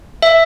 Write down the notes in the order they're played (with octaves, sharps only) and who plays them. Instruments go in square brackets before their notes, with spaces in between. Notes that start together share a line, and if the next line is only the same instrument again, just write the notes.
[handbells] E5